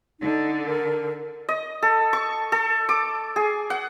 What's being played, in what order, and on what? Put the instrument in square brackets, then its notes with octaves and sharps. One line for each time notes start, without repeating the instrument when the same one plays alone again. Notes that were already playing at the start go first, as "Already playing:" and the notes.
[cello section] D3 [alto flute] D#4
[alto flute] A#4
[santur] D#5
A4
C#6
A4
D6
G#4
F#5